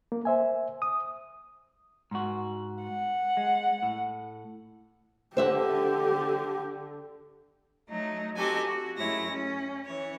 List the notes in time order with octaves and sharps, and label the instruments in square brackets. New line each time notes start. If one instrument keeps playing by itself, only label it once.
[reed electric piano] A#3
C5 E5 G#5
D#6
[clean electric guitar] G#2 F#4
[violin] F#5
[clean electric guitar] G#3
A2
[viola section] D3 [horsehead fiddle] G4 [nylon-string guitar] C5 E5 F#5
[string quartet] F#3 A3 D#4
C4 D#4 F#4 G4 A4 G#5
F#4
F#2 G#3 A3 E4 C#5 A#6
C#4
E3 C#5